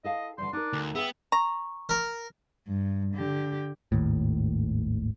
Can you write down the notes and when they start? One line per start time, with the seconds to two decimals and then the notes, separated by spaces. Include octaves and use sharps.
0.04 E4 A4 D#5 F5
0.38 D3 E3 G3 C6
0.53 D4 D#4 A#4
0.73 D2
0.95 B3 G#4 E5 G5
1.32 A#5 C#6
1.89 A#4
2.67 G2
3.14 D3 G4
3.92 G#1 D#2 A2